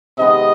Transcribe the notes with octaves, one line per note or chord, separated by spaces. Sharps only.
C3 D#3 G#3 B3 D#5